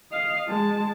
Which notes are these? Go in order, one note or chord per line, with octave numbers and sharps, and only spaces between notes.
D#5 F5
G#3 A5